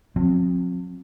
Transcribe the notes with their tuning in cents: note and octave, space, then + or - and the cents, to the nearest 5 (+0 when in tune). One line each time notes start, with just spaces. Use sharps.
F3 +45 C4 +25